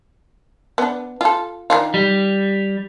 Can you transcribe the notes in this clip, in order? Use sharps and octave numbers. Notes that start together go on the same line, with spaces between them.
B3 D4
F4 A4
D#3 D4 F4
G3